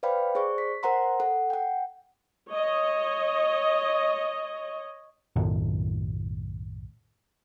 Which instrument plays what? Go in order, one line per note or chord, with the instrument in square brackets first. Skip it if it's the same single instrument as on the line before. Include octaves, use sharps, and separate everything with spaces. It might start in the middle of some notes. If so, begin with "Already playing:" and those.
[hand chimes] B4 C5 D5 F5 G5 B5
G#4 C5 D5 C#6
B6
A#4 C5 F#5 A#5 C6
A4 F#5
F#5 G5
[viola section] C#5 D#5
[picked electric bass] B1 F#2 A2 D#3